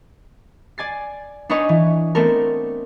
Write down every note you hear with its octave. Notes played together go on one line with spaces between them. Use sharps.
D5 G#5 A6 C7
D4 D#4 B4 C#5 D#5 G#5
E3
A3 B3 C4 D4 A4 A#4